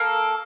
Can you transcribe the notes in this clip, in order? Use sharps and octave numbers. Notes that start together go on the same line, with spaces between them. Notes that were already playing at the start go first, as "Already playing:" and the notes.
Already playing: A#3 A4